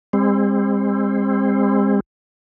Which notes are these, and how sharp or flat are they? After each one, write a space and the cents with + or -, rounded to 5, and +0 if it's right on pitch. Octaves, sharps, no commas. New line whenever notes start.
G#3 -45 C4 +15